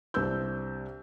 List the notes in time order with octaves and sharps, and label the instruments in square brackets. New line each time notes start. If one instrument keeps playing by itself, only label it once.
[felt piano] C2 D4 C5 E6 G6